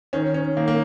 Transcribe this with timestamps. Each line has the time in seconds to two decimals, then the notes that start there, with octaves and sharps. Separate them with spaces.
0.13 D#3 C#4
0.34 C#4
0.57 D#3 A#3
0.68 A#3